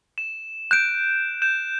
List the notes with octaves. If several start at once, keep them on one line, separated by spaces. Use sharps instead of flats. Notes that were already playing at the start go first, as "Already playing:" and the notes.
E7
F#6 G6 D7 E7
G6 E7